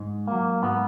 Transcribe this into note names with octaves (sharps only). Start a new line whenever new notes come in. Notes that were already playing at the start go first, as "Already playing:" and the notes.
Already playing: G#2
F#3 A#3
G#2 B3